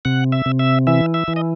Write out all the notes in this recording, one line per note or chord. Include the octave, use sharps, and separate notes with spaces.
C3 F#5
E5
C3
E5
E3 E5
E5
E3
D#5